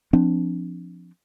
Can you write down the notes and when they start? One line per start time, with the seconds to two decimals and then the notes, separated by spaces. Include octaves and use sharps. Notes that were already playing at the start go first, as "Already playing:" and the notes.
0.13 F3 C4 D4